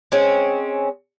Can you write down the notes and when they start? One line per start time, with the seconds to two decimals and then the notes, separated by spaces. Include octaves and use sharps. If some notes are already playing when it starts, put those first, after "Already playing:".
0.12 G#3 C4 C#4